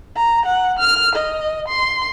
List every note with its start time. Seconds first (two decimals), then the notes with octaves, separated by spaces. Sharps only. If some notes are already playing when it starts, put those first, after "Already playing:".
0.17 A#5
0.46 F#5
0.80 F6
1.16 D#5
1.69 C6